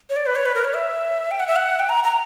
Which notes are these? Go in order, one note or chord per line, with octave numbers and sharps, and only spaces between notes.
C#5
D5
B4
C#5
B4
A#4
C#5
E5
G5
F#5
E5
F#5
G5
A#5
A#5